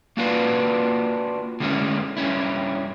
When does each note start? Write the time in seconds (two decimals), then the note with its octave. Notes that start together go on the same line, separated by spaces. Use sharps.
0.17 A#3 D4 F4 F#4 B4 F5
1.60 D3 G#3 A3 C4 C#4 E4
2.17 G2 A#2 C#4 E4